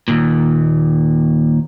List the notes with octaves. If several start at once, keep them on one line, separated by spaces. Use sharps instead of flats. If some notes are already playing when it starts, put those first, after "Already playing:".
D#2 A#2